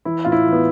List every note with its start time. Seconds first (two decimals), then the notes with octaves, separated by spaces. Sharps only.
0.05 E3 E4
0.25 A2 F4
0.32 E4
0.46 E3
0.53 B3